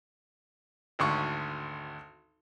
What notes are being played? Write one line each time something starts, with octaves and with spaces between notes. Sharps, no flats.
G#1 D2 C#6